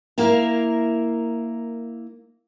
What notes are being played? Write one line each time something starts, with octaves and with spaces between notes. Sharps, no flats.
A#3 E4 A#4 F5